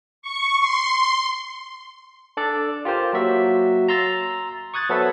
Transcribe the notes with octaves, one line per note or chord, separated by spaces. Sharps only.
C#6
C6
D4 A4 D5
F4 G4 A#4 C5
F#3 A#3 F#4 E5
A#5 C6 E6 A6
C#6 D#6 F#6 G#6 A6
F#3 B3 A4 B4 C5 E5